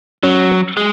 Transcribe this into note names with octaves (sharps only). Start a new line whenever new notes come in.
F#3 C#4
G#3